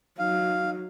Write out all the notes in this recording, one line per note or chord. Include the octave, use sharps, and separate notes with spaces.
F#3 D#4 F5